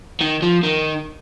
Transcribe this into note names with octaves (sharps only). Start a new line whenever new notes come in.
D#3
F3
D#3